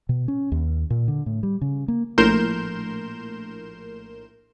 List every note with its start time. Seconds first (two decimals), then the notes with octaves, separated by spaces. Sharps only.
0.09 B2
0.28 C#4
0.52 D#2
0.90 A#2
1.08 D3
1.26 A2
1.43 G3
1.61 C#3
1.88 A#3
2.18 A#1 A2 A#4 C6 G6 E7